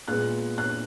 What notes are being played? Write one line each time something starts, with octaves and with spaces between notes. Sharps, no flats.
A#2 G#3 B3 F#6
F#6